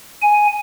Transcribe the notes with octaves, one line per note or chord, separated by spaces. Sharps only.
G#5